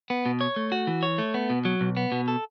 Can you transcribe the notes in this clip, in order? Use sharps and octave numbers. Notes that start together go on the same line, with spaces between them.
B3
B2
C#5
A3
F#4
E3
C#5
A3
B3
B2
F#3
B1
B3
B2
A4